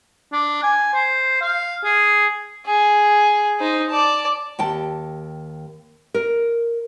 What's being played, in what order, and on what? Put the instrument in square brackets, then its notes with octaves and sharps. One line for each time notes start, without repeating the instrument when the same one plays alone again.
[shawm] D4
G#5
C5
F5
G#4
[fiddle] G#4
D#4 C5
D5 A5
[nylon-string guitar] D#2 G5 A5
A#4